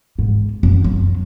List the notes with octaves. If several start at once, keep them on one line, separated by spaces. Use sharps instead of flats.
G#2
F#2
F#3